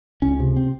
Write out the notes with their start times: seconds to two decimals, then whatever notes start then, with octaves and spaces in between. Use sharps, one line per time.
0.22 C#2 C#4
0.40 C3
0.57 C4